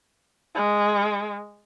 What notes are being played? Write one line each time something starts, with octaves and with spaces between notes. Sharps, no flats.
G#3